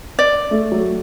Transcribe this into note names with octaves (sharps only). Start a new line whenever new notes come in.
D5
A3
F#3 A3